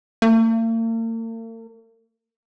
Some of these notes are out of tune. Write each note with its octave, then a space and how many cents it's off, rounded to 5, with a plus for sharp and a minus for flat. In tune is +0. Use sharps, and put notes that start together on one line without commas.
A#3 -45